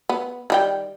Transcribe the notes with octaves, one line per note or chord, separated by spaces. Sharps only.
B3
D#3 G3 G5